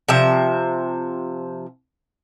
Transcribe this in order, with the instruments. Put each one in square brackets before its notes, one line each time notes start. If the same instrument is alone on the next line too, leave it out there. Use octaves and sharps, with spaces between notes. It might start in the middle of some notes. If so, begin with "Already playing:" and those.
[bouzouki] C3 F3 E5